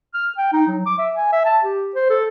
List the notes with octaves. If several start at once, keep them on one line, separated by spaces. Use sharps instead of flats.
F6
G5
D#4
F#3
D6
E5
G#5
E5
A5
G4
C5
A4